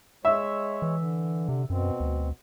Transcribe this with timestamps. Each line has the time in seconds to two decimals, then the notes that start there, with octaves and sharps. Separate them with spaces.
0.25 G#3 C#5 E5
0.82 E3
0.97 D3
1.49 C3
1.70 F#2 B2 C4
2.00 D2